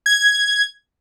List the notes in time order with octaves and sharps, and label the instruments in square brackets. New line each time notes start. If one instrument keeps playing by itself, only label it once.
[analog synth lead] G#6